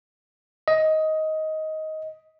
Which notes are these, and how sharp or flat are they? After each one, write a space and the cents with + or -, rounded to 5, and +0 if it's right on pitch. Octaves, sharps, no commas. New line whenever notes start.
D#5 +15